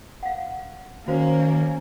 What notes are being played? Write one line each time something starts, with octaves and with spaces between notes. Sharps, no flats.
F5 F#5
D#3 A#3 C#4 F#4 C5 F5